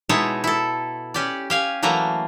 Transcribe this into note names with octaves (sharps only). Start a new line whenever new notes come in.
B2 G#3 D#4 E4 C#5 A5
E4 A4
C#4 G4 D5
G4 F5 G#5
E3 F#3 A3 A#3 A#5